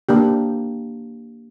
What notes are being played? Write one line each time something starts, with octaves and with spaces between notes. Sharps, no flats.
A#3 D4 G4